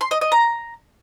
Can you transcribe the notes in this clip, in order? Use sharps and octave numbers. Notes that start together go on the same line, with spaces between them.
C6
D#5
D#5
A#5